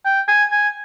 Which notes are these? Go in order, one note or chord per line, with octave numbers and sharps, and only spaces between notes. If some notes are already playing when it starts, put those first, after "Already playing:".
G5
G#5
G#5